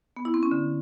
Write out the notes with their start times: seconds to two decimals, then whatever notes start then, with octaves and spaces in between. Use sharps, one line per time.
0.17 B3
0.25 E4
0.34 C4
0.43 C#4
0.51 D3